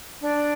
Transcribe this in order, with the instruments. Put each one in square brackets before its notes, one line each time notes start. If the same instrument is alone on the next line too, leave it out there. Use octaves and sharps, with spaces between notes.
[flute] D4